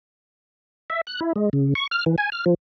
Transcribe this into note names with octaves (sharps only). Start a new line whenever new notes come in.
E5
F#6
E4
G#3
C#3
C#6
F6
E3
G#5
F6
F3